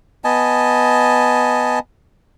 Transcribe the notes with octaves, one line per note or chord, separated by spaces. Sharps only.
B3 D#5 G#5 A5